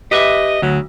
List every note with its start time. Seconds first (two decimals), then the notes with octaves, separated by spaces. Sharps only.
0.11 G4 B4 D#5 E5
0.62 D2 F#3